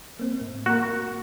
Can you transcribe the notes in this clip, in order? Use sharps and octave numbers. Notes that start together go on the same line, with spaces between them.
A#3 C4
A2
A#3 F#4 A#4